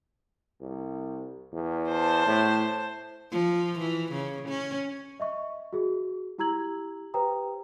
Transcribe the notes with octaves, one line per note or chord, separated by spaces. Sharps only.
C2
E2
C5 A5
A2
F3
E3
C#3
C#4
D#5 E5 C#6
F#4 G#4
E4 G4 A#5 E6 G#6 F#7
G4 B4 C5 G5 A#5 D#6